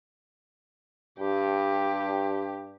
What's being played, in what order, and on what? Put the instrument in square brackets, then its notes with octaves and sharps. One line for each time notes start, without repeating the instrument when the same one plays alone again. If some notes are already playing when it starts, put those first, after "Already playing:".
[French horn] G2 [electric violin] G4